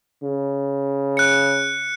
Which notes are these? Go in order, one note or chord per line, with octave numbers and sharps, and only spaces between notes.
C#3
F#6 C#7